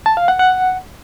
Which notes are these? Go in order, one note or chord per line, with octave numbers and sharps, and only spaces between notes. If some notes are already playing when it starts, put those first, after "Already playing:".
A5
F5
F#5
F#5